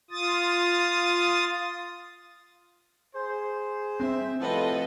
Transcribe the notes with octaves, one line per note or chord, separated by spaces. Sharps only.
F4 D#6 A6
G#4 C5
C4 E5
A2 C3 F3 A4 B4 D#5